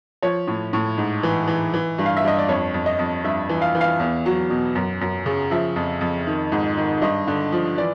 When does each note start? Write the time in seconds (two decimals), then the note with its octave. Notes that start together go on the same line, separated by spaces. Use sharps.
0.22 F3 C#5
0.47 A2
0.73 A2
0.98 G#2
1.23 E3
1.48 E3
1.74 E3
1.98 G2
2.06 F5
2.17 E5
2.24 G2 D#5
2.38 D5
2.48 F2 C#5
2.74 F2
2.86 D#5
2.99 F2
3.24 G2 E5
3.49 E3
3.62 F5
3.75 E3
3.81 F5
3.99 E2
4.26 F#3
4.50 B2
4.75 F#2
5.01 F#2
5.26 C#3
5.51 F3 E5
5.76 F2
6.01 F2
6.27 D#3
6.52 G#2
6.77 D#3
7.01 G2 D#5
7.27 D3
7.52 F3
7.78 E3 D5